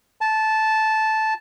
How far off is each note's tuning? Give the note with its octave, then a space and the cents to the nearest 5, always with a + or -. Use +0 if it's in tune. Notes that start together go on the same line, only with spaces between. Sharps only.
A5 -10